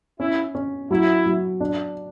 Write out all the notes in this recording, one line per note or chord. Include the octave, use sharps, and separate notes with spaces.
C#4 E4
C#4
F#3 E4
F#3
D4